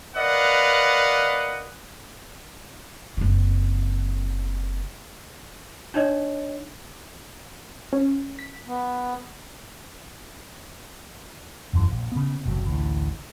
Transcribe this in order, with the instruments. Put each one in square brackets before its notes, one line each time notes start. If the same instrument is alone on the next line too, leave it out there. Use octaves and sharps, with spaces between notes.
[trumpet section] A#4 B4 D5 D#5 F5 F#5
[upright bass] F#1 C3
[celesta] D4 D#4 C#5 D#5
[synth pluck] C#4
B6
[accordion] B3
[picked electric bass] E1 F#2 E3
A#1
C#3 B3
F#1 B1 C3 F#3
A1 D2 A2